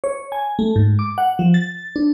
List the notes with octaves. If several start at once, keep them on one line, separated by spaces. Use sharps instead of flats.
C#5
G#5
A3
G#2
D6
F#5
F3
A6
D4